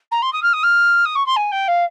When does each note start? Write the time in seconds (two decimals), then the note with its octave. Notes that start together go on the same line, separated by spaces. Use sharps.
0.11 A#5
0.22 C6
0.32 D#6
0.42 F6
0.53 D#6
0.63 F6
1.05 D#6
1.15 C#6
1.26 C6
1.36 G#5
1.51 G5
1.68 F5